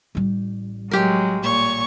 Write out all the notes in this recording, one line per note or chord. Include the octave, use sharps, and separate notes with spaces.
A1 G3
F#3 G#3 G4 A#4
A#2 C#5 C#6